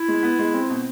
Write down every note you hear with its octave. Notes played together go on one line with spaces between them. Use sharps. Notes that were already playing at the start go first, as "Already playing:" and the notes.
Already playing: E4
G#3
B3
G#3
C4
B2